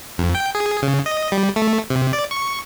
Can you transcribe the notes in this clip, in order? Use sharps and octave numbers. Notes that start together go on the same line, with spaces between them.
F2
G5
G#4
C#3
D#5
G3
A3
C3
D5
C#6